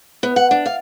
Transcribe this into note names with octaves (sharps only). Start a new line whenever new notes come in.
B3
F#5
D4
F5